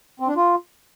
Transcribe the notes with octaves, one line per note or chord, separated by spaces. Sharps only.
C4
D4
F4